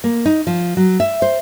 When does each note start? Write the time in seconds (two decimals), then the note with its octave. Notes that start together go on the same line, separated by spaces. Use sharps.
0.04 A#3
0.26 D#4
0.47 F3
0.77 F#3
1.00 E5
1.22 C5